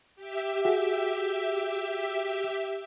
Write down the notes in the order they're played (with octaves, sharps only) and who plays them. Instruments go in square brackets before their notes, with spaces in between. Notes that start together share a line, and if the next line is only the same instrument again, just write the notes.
[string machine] G4 E5
[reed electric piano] F#4 G#4